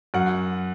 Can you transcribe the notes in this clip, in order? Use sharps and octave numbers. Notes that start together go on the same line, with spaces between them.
F#2 F#5